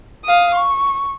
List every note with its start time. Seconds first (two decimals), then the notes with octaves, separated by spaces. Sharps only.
0.25 F5 D#6
0.55 C#6